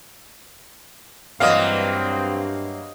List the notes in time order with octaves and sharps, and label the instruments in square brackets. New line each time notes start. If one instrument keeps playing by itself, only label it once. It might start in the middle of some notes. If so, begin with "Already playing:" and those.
[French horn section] G2 [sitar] E3 F#3 A#3 [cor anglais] C4 [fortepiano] D#5 F5